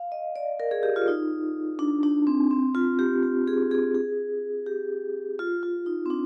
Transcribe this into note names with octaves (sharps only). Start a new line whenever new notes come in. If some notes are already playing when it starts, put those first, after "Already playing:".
Already playing: F5
D#5
D5
A#4
G#4
G4
F4
D#4
D4
D4
C4
C4
F4
G4
G4
G#4
G#4
G#4
G4
F4
F4
D#4
C4
D4